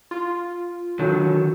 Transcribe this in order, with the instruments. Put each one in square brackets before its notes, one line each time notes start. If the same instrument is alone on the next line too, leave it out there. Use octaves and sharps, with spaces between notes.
[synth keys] F4
[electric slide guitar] D3 D#3 F#3